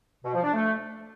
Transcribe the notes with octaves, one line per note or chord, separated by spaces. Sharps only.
B2
F3
D4
A3